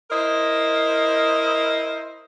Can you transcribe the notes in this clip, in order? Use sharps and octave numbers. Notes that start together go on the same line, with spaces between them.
E4 A#4 C5 D#5